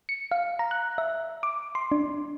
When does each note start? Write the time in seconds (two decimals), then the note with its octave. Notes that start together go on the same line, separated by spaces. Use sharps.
0.09 C#7
0.31 F5
0.59 A#5
0.71 F#6
0.98 E5
1.43 D6
1.75 C6
1.92 D4